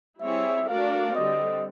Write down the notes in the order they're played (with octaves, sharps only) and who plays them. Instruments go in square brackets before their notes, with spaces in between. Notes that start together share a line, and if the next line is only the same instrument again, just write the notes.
[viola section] G3 C4 E4 G#4 C#5 [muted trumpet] E5
[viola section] A3 D4 F#4 A#4 D5 [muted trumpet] F5
[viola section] D3 G3 C4 [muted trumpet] D#5